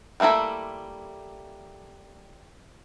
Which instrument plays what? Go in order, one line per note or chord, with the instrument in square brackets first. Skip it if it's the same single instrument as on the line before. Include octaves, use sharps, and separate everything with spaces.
[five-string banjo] G3 A3 A#3 E4 A4